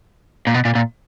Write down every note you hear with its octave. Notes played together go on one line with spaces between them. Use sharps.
A#2
B2
A#2
A#2